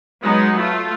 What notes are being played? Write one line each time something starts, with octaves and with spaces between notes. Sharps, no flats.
F#3 G#3 B3 D#4
A3 F4